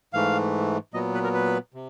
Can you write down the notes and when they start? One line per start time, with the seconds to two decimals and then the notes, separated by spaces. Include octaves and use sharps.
0.13 G#2 E3 A3 F5
0.94 A#2 F#3 B3 D#5
1.14 B4
1.24 A#4
1.34 B4
1.74 C3